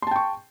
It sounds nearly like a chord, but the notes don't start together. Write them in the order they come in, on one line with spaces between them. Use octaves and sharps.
C6 A5 G5 C#6